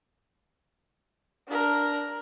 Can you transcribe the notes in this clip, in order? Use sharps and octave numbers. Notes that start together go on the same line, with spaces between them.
D4 A#4